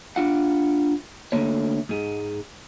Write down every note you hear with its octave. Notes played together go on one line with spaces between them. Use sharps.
D4 F4 F#5
D2 D3 A3 A#3 C#5
G#2 G#3